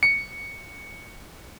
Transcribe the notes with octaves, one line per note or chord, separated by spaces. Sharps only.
C#7